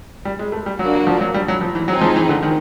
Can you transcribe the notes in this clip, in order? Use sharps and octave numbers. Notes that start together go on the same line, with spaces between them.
G3
G#3
A3
G3
F#3 A#3 D4 F#4
F#3
F3
F#3
G3
F#3
F3
E3
F#3 C4 D#4 G#4
F3
E3
D3
D#3